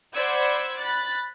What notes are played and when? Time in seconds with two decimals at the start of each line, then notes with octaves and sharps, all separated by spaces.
0.15 C5 D5 F#5 B5 E6 G#6
0.78 B5 F#6 A6